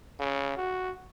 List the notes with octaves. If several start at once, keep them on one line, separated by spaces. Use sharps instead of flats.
C#3
F#4